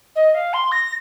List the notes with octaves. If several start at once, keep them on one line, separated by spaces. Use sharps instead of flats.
D#5
F5
C6
A#6